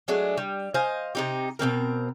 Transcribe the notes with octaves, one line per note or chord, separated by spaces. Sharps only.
F#3 G#3 A3 D4
G3
C5 D#5 F5 G#5
C3 D#4 G4
B2 G3 C4 A#4